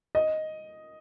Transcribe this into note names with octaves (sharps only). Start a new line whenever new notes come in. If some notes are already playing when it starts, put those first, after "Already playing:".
D#5